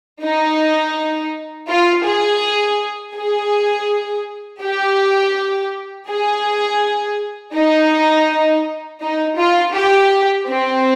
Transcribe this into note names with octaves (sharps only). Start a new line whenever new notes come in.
D#4
F4
G#4
G#4
G4
G#4
D#4
D#4
F4
G4
C4